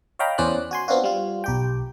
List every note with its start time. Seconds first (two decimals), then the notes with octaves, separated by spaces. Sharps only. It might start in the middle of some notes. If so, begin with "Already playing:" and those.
0.19 C#5 D#5 F5 G5 A#5 B5
0.38 E2 E3 C#4 C5 D5 F#6
0.71 F#4 G#5 C6
0.88 B3 C4 D4 F4 F#4
1.04 G3 F4
1.44 B1 G4 G5